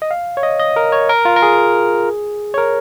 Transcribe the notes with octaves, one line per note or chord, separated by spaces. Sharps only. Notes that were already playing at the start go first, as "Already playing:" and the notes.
D#5
F5
C#5
D#5
D#5
A#4
C#5
A#4
F4
A#4
G#4
C#5
A#4